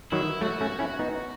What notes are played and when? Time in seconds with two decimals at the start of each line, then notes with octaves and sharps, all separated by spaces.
0.12 D#3 F#3 E4
0.41 F#3 A3 F#4
0.61 A3 C#4
0.79 C#4 E4
0.99 B3 D#4